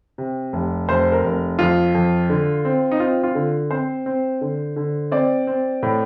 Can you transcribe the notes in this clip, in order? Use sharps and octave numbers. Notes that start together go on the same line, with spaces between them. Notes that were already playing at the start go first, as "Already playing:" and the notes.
C3
F1
F1 C5
A#4
F1
F2 F4
F2
D3
C4
D#4
C4 F4
F4
D3
C4 C5
C4
D3
D3
C4 D5
C4
A2